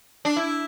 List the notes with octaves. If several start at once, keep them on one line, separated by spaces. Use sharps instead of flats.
D4
E4